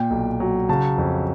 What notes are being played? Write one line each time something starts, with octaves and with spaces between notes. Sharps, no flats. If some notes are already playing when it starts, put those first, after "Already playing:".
Already playing: A#2 G5
B1
F#3
C#3 A5
F2